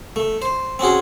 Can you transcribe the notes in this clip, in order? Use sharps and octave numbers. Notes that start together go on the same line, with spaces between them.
A3
C5
C4 C#4 F#4 G#4